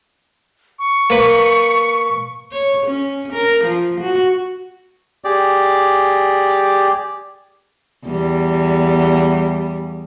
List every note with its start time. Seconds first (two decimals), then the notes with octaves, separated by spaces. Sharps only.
0.79 C#6
1.10 A#3 B4
2.52 C#5
2.86 C#4
3.33 A#4
3.64 F3
4.00 F#4
5.25 G4 G#4 D5
8.05 E2 G3